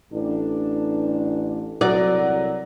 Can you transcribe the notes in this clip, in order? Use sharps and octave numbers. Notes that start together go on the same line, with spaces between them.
A1 D4
C2 F#3 D5